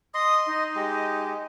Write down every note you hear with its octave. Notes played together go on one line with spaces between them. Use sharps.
D#5 C6 D#6
D#4
G#3 G4